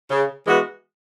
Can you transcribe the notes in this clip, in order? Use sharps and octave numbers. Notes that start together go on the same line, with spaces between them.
C#3
E3 G#3 B3 F#4